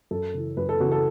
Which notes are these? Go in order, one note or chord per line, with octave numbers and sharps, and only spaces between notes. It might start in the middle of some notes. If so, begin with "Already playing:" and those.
F#2 A4
C#3 E3
F#2 B4
A4
C#3 E3 F#4
A4